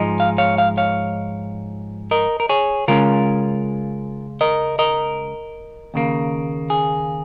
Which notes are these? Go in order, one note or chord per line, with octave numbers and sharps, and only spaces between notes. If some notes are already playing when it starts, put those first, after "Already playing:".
Already playing: G#2 F3 G#3 D#4
F5
C#5 F5
F5
C#5 F5
A#4 D#5
A#4
G#4 C#5
C#3 G#3 C#4 F4 A#4
A#4 D#5
A#4 D#5
D#2 C#3 A#3
G#4